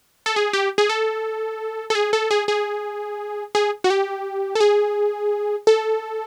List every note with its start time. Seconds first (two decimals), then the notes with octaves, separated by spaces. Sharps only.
0.26 A4
0.36 G#4
0.53 G4
0.78 G#4
0.89 A4
1.90 A4
1.95 G#4
2.13 A4
2.31 G#4
2.48 G#4
3.55 G#4
3.84 F#4
3.90 G4
4.55 A4
4.60 G#4
5.67 A4